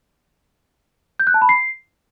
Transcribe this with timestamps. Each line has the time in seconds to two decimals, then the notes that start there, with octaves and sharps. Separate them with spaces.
1.20 G6
1.27 F#6
1.34 A5
1.42 B5
1.49 C7